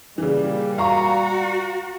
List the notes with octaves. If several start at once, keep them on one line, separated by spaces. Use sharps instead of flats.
A#2 C#3 E3 G3
F#4 F5 A#5 C#6